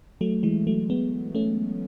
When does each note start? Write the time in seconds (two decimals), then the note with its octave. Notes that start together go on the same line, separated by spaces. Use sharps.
0.21 F#3 A3
0.43 E3 G#3
0.67 F#3 A3
0.90 G#3 B3
1.35 A3 C#4